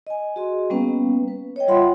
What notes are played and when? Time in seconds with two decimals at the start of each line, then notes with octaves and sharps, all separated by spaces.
0.07 D#5 G#5
0.36 F#4 G#4 D#5 C6
0.70 G3 A#3 B3 C#4 B4 F5
1.28 B4
1.56 C#5 D#5 G5
1.68 G3 F4 E5 F#5 B5 C6